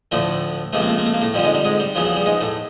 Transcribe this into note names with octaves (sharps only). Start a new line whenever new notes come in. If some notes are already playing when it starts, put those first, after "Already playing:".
D2 A2 D3 F3 A3
C#2 C3 F3 A3
A#3
A3
A#3
A3
A#3
A2 A3
F2 D3 F3 G3
G#2 G#3
G3
G#2 G#3
G3
E2 C#3 F3 F#3
F#3
G3
G#2 G#3
A2 A3